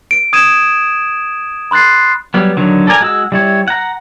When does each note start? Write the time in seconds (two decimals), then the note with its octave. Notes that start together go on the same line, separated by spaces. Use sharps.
0.11 D7
0.33 D#6 G#6 D#7 E7
1.71 B5 C6 F#6 A6 C7
2.34 F#3 G3 B3
2.57 D3 D#3 F#3
2.87 A4 A#4 D5 G#5 A#5
3.00 G#3 F#4 E6
3.32 G3 E4 C#5
3.68 F#5 A#5